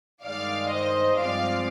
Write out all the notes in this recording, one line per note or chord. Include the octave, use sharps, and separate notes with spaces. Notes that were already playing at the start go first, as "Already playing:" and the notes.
G2 D#3 G#3 D#4 D5 F5
C5 D#5
G2 F3 G#3 C4 F4 D5 F5